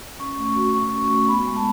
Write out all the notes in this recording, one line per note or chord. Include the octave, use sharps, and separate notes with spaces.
C#4 C#6
A3
F#4
A3 C#6
C#4
A3
B3 B5
G#3
A5